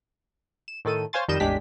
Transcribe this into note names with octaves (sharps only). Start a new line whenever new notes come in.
E7
A2 D#3 A4 D#7
C5 C#5 F5 G#5 C6 A6
F2 D#3 G3 D#5 G6 E7
A1 E2 G#3 D4 G4 B6